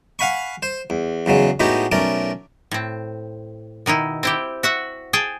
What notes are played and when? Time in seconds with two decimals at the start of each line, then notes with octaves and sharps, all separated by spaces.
0.19 F5 F#5 G#5 B5 C#6
0.63 C5
0.90 E2
1.26 E2 C#3 F#3 G#3
1.60 A2 G#3 B3 D#4 F#4 G4
1.92 B1 A3 C#4 A#4 D5
2.71 A2 C4
3.86 B2 D#3 D#4 E4
4.23 C4 E4 G4
4.63 F#4 E5 F#5
5.13 G#4 G5 A5